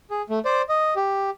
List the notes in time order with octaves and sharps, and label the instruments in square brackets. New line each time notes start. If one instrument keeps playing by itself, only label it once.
[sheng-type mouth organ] G#4
A3
C5 D5
D#5
G4